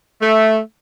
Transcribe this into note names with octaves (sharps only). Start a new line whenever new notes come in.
A3